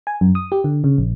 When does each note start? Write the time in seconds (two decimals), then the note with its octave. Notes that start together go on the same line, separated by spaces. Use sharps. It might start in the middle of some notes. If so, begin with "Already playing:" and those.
0.07 G#5
0.21 F#2
0.35 D#6
0.52 G4
0.64 D3
0.84 C#3
0.98 A#1